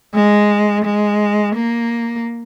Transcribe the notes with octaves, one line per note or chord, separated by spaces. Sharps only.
G#3
G#3
A#3